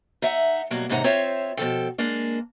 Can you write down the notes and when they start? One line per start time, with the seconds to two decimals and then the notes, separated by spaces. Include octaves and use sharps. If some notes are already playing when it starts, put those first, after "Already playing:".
0.22 D#4 E5 F#5
0.71 G2 B2 F#3 A#3 F#4
0.89 D#2 G#2 C3 D#4 F#5 A#5
1.04 C4 F4 C5 C#5 E5
1.57 B2 F3 A4 G5
1.98 G#3 A#3 D4